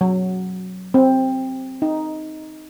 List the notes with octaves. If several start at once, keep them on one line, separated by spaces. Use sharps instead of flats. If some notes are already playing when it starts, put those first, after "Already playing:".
F#3
C4
D#4